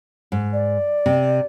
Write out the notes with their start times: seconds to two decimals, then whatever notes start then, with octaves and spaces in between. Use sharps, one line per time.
0.32 G#2
0.53 D5
1.06 C3